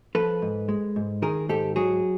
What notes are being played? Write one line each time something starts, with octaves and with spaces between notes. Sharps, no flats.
F3 A4 B4
G#2
G#3
G#2
D#3 G#4 A#4
G#2 G4 A4
F#3 F#4 G#4